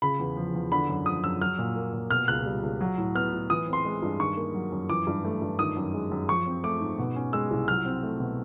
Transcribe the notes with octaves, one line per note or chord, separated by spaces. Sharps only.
C#3 B5
E2
F3
E2
D3 B5
F#2
F3 D#6
F#2 E6
F#3 F6
A#2
A#3
A#2
B2 F6
C#2 F#6
G3
C#2
F#3
A2
B3 F6
A2
E3 D#6
C4
C6
G#3
G2
D#3 C#6
A#3
F#3
F#2
E3 D6
G2
A3
G2
D#3 D#6
F#2
G#3
F#2
F3 C#6
C4
A3 D6
G#2
B2
C#4
G#3 E6
C2
F#3 F6
C4
A3
B2